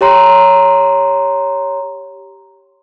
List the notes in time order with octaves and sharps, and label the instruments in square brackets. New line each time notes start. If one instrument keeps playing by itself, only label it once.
[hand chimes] G4 C#5 A#5 C6